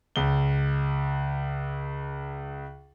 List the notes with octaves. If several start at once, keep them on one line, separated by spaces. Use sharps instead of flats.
C#2 G7